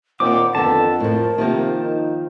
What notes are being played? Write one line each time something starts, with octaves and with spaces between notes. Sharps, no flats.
D#2 A#2 C4 F#5 D6
F2 D3 D#3 B3 A4 A5
A2 F3 A#4
C3 D#3 F3 A#3
D#4